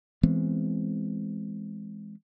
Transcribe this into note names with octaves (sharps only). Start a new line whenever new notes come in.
E3 G#3 B3 C4